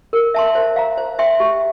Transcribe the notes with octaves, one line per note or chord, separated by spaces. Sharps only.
A#4
E5 A5 C6
C5
F5 A#5
C5
E5 G5 C6
G4